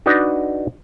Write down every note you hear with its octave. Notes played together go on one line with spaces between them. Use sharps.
D4 D#4 F#4 B4 D5 D#5